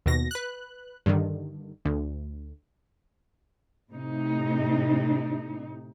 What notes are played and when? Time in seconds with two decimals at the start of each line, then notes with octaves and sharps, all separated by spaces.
0.06 D#2 B2 A#6
0.31 B4 F#6
1.06 G2 D3 D#3
1.85 D2
3.90 A2 C3 D#4